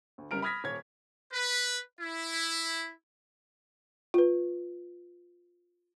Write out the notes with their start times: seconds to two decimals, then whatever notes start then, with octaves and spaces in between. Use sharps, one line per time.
0.18 D2
0.31 C#2 F#2 G3 A#4 F6 D7
0.42 B5 D#6 F6 G#6 A#6 B6
0.64 D#1 C#5 G#6
1.32 B4
2.00 E4
4.14 F4 B4